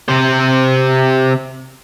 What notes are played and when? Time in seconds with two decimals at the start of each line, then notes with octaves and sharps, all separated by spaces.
0.08 C3 C5